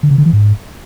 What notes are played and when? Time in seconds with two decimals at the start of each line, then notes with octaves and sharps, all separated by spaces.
0.03 D3
0.11 C#3
0.18 D3
0.26 E3
0.33 G#2